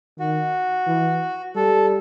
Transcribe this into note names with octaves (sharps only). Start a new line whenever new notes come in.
D#3 F#4
E3
G3 A4